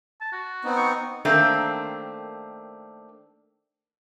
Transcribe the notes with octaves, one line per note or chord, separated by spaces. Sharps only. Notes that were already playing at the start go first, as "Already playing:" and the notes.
A5
F#4
B3 C4 D#4
C#6
D#3 A3 A#3 C4 D4